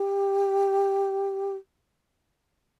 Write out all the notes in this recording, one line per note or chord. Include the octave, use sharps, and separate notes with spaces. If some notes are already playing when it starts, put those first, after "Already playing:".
Already playing: G4